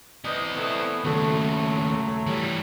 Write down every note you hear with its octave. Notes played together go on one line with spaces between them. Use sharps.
E3 C4 D5 D#5
E3 A3 B3
D#2 C#3 F#3 A3
E3 G3